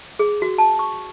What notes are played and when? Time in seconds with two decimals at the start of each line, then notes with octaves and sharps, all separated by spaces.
0.19 G#4
0.42 F#4
0.58 A5
0.79 C#6